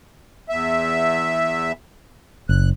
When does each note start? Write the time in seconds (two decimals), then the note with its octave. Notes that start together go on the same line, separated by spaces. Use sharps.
0.49 E2 E5
2.49 F#1 F#6